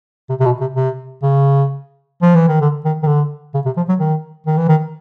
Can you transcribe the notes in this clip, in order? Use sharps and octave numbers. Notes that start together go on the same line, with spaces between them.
C3
C3
B2
C3
C3
C#3
F3
E3
D#3
D3
D#3
D#3
D3
C#3
C3
F3
F#3
D#3
D#3
E3
D#3